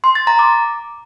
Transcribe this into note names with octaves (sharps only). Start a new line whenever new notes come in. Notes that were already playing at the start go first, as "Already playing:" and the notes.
C6
A6
A#5
D6